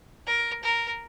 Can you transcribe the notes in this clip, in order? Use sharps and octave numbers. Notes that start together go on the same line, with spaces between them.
A#4
A#4